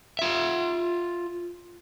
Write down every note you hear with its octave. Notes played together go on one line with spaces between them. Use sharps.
F4 E5